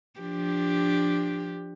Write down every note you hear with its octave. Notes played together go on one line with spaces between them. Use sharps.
F3 D4 G4